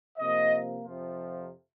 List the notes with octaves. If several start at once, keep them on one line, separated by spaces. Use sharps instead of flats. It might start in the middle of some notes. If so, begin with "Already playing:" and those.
C3 F3 A#3 D#5
F2 C3 F3